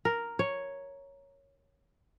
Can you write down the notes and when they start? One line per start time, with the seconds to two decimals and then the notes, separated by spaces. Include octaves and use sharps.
0.05 A#4
0.39 C#5